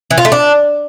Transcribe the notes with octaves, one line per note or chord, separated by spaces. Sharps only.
E3
F4
A3
D4